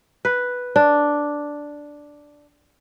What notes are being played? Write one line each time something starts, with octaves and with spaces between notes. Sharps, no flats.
B4
D4